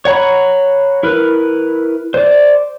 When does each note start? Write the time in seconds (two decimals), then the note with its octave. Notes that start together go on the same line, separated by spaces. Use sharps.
0.05 C#5 F#5 A#5 B5
1.03 E4 A#4 B4
2.14 C5 D5